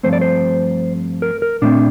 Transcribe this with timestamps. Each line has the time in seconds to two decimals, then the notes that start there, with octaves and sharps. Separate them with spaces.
0.03 G2 F3 A3 C4 C5
0.13 D5
0.21 C5
1.22 A#4
1.42 A#4
1.62 A#2 A3 C4 D4